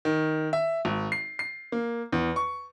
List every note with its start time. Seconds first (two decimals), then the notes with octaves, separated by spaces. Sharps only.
0.05 D#3
0.53 E5
0.85 G#1
1.12 C7
1.39 C7
1.72 A#3
2.12 E2
2.36 C#6